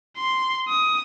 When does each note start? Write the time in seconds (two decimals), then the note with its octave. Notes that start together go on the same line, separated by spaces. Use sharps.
0.18 C6
0.69 D#6